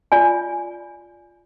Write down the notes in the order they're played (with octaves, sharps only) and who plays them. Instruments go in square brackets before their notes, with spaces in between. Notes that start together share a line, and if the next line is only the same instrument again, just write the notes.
[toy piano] F4 D5 G#5